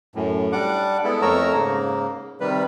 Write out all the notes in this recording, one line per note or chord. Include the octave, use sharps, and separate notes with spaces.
F#2 A2
G3 D4 F#5 D6
G#3 B3 E4 A4
F2 A3 A#4 C#5 A#5 E6
G#2 C#3 A#3
C3 D#3 G3 B4